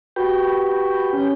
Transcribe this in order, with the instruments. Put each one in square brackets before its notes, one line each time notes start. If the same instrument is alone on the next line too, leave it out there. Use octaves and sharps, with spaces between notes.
[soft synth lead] F#4 [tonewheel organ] G4 B4 G5
[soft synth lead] C#4